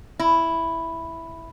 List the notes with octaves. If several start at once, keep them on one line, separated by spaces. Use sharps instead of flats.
E4